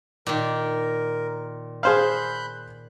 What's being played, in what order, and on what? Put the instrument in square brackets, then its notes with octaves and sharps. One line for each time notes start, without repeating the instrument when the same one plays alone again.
[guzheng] A#2 D#3 [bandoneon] A#4
[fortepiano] G#4 C5 F5 [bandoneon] B5 F#6 G6